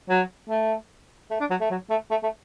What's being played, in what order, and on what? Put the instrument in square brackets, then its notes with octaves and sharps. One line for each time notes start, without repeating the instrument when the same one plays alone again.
[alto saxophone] F#3
A3
A3
D4
F#3
A3
F#3
A3
A3
A3